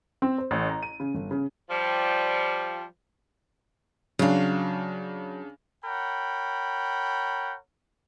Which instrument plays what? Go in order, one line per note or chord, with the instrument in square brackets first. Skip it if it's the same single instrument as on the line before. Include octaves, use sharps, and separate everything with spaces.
[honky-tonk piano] C4
C5
A1
A#5
D#7
C#3
G1
C#3
[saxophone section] F3 G3
[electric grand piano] C#3 D4 [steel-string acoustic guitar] F#3 F5
[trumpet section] A#4 C#5 F#5 G5 B5